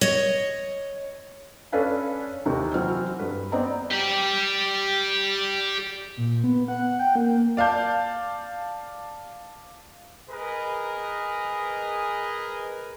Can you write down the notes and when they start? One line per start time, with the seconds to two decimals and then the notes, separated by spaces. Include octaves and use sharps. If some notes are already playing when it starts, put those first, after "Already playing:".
0.01 C#5 D#5
1.72 C#4 D4 A4 B4 F5 G#5
2.46 D#2 C3 E3 D#4
2.74 E3 F#3 C4 F6
3.19 G2 B4
3.52 B3 C4 D5 D#5 A#5
3.91 G4 D5
6.17 A#2
6.44 B3
6.68 F#5
6.99 G5
7.15 A#3
7.57 D5 F5 A5 G6
10.29 G#4 A#4 B4 D#5